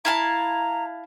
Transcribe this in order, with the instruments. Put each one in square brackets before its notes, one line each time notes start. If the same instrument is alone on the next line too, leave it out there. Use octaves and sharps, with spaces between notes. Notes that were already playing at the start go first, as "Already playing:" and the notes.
[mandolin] E4 F5 A5 [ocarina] A#5